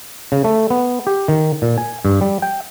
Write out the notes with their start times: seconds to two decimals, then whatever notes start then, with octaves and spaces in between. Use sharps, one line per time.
0.32 C#3
0.44 A3
0.70 B3
1.07 G4
1.28 D#3
1.62 A#2
1.78 G#5
2.05 G2
2.21 G3
2.42 G5